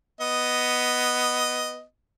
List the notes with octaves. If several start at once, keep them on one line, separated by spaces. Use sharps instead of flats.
B3 D#5